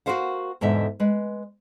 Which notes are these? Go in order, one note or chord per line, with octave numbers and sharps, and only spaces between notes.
F#4 G#4 A#4 C5 F5 F#5
E2 G#2 B2 D3 E5
G#3 B4